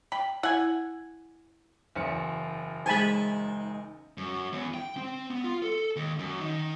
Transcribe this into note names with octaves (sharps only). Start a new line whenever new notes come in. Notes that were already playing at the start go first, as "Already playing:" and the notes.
G5 B5
E4 F#5 G#5
F#1 E2 C#7
G#3 D#4 C5 G#5 A5 B5
F#2
E2
G5
C4
B3
F4
A4
D#2
F#2
D#3